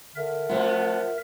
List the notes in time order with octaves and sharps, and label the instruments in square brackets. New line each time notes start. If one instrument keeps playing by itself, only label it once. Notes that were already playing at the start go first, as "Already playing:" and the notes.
[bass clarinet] D3 [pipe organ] A#4 E5
[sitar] F2 B3 [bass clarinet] A3 [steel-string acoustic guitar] F4 C5 D5